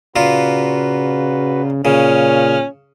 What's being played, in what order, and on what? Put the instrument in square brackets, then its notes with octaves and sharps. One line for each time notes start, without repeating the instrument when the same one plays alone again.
[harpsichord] A#2 F4 [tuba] C#3 [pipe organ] F#4 B4
[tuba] A#2 [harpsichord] C#3 [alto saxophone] C#4 [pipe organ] F6